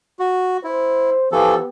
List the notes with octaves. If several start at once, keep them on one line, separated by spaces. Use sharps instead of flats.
F#4
E4 C5
E3 F3 B3 G4 A4